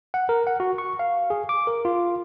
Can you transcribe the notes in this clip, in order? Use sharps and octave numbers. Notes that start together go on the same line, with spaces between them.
F#5
A#4
F#5
F#4
C#6
F5
G#4
D6
A#4
F4